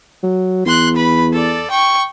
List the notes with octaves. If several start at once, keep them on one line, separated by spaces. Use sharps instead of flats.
F#3
E2 C6 F#6
B4 B5
A4 D5
G5 C#6